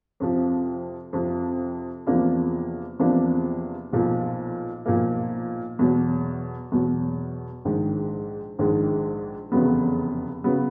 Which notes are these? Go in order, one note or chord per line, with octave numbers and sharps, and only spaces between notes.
F2 C3 F3
F2 C3 F3
E2 C3 F3 A#3 D4
E2 C3 F3 A#3 D4
B1 A#2 F3 A#3
B1 A#2 F3 A#3
E2 B2 F#3
E2 B2 F#3
A#1 G#2 D#3 G#3
A#1 G#2 D#3 G#3
F1 E2 C#3 F#3 B3
C#3 F#3 B3